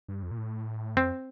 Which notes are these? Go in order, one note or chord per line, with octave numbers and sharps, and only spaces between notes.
G2
F2
A#2
A2
F2 C4